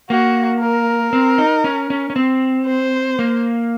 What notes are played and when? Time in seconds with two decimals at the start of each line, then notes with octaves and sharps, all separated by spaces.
0.10 A#3 F#4
0.61 A#4
1.13 C4
1.38 D#4
1.64 C#4
1.90 C#4
2.10 C#4
2.16 C4
2.67 C5
3.19 A#3